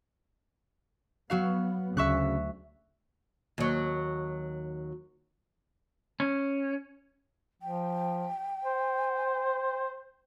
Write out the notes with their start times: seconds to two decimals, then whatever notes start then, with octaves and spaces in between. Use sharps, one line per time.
1.30 F#3 B3 F#4 F5
1.97 D2 C#3 E5 C#6 F#6
3.58 D#2 F#3
6.20 C#4
7.62 F3 G5
8.64 C5